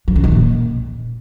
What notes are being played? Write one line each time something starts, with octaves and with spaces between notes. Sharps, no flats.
F3
D3
D#3
A#2